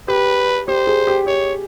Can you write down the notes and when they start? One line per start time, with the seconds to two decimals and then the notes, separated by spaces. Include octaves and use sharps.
0.08 G4 B4
0.68 G4 C5
0.87 G#4
1.07 G4
1.27 G4 C#5